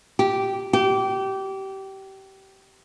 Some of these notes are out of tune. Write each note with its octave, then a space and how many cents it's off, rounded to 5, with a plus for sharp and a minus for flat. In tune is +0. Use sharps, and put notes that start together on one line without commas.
G4 -10
G4 -25